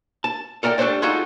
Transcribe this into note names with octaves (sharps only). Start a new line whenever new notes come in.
A5
A4 A#4 D5 F#5 G5
G3 A3 D4 A4 C5 D5
G#3 D#4 F4 F#4 G#4 A4